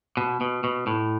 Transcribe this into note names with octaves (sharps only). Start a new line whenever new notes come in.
B2
B2
B2
A2